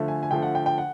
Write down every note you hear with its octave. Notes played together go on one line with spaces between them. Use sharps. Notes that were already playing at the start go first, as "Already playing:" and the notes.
Already playing: D3 F3 A3
G#5
G#5
D3 F3 A3 G5
F#5
G5
G5
F#5